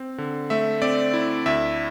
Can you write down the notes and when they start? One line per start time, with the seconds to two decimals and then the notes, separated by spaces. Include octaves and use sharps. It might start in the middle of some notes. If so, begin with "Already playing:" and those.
Already playing: C4
0.18 D3
0.50 A3 E5
0.82 C4 D5
1.14 E4
1.46 D2 E5